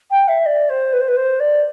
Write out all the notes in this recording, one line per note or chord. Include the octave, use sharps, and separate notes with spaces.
G5
E5
D5
C5
B4
C5
B4
C5
D5